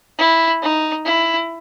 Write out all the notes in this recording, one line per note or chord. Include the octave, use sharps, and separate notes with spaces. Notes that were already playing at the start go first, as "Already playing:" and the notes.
E4
D#4
E4